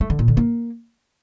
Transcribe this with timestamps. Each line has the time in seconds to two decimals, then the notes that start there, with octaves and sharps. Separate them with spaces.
0.01 A3
0.10 D3
0.19 A#2
0.28 D3
0.37 A#3